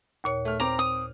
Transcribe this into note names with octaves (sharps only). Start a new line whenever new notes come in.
D#2 A#2 C#5
A3 F6
C4 A#5 D6 F7
D#6